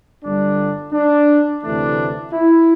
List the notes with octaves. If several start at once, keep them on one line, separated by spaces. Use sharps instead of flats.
G1 G2 D3 G3 D4
D4
D2 C3 E3 A3 D4
E4